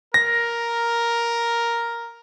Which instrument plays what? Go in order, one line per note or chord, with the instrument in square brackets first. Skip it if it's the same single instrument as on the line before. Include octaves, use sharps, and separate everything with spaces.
[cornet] A#4 [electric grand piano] A#6